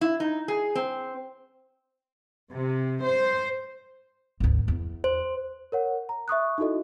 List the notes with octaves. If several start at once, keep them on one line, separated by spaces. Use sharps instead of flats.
E4
D#4
G#4
C4
C3
C5
G#1 D2
E2
C5
A#4 C#5 F#5
A#5
E5 C#6 D#6 F#6
D#4 E4 F#4 A4 D#5